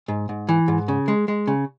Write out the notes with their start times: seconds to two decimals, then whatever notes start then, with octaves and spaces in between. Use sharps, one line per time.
0.08 G#2
0.29 G#2
0.49 E3
0.68 G#2
0.88 C#3
1.08 G#3
1.28 G#3
1.47 C#3